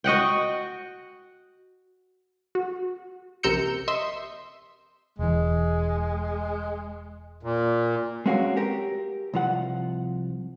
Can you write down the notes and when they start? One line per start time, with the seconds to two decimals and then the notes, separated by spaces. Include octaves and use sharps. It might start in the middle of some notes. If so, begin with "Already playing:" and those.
0.04 F#4 D#5 F#5 G5
2.55 F#4
3.43 A#1 C3 A#4 E6 G6 C#7
3.88 D#5 E5 C6
5.19 E1 E3 G#3
7.43 A#2
8.26 G#3 C4 C#4 F#4 A#4 F5
8.57 G4 A#4
9.34 C2 F3 F#5